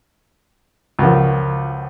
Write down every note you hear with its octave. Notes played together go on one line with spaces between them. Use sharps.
C#2 F#2 F3